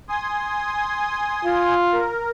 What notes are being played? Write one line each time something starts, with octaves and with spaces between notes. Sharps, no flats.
G#5 C6 D#6
F4
A#4